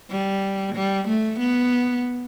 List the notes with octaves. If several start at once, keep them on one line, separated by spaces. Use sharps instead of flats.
G3
G3
A3
B3